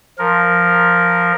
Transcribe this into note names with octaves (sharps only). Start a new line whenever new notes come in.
F3 A#4